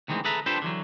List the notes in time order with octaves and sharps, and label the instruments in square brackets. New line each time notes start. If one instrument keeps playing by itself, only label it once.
[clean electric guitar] D2 D#3 E3 G#3 C4
G#4 A4 B4 E5 A#5
D4 F4 G4 A4 B4 C5
D3 E3 F#3